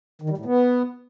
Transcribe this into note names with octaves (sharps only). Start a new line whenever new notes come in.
D#3
G3
A2
B3